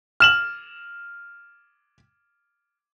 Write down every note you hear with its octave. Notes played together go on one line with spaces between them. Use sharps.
F6 E7 F#7